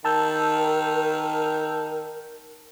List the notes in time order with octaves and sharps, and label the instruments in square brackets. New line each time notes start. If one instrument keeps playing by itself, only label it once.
[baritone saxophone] D#3 [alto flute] A#4 [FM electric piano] A5 E6 G6